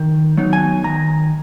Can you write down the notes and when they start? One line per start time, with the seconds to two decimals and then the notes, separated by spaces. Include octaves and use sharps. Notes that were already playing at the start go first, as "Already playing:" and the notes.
Already playing: D#3
0.37 F#3 B3 D#4
0.53 G#5
0.84 D#3 A#5